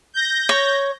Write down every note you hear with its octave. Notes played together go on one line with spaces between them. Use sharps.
G6 A#6
C#5